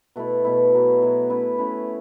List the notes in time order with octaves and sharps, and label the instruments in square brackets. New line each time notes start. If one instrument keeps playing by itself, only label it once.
[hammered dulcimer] B2 A3 E4
B2 A3 E4
B2 F#3 B3
B2 F#3 B3
A3 C#4 E4 B4
A3 C#4 E4 B4